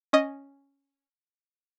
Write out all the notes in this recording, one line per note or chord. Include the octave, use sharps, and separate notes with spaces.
C#4 D#5